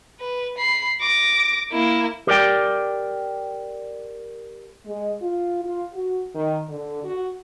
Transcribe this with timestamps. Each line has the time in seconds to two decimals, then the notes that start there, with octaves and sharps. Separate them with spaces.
0.20 B4
0.58 B5 C7
1.01 D6 A#6
1.72 A#3 E4
2.27 G4 A#4 D5 G5
4.86 G#3
5.22 F4
5.64 F4
5.94 F#4
6.35 D#3
6.69 D3
7.04 F#4